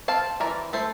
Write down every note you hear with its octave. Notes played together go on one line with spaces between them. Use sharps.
C4 F5 A5
E3 A#4 D5
A3 A4 C5